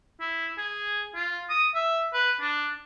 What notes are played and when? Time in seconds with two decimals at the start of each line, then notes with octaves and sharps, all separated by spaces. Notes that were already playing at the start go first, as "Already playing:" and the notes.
0.20 E4
0.58 G#4
1.15 F4
1.49 D#6
1.75 E5
2.13 B4
2.40 D4